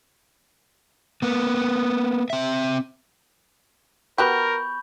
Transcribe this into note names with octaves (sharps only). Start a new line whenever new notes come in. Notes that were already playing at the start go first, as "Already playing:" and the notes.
A#3 B3
C4 E5
B3 F#4 G4 A#4 B5 C#6 G6